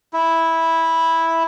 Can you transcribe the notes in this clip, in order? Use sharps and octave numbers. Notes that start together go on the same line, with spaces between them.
E4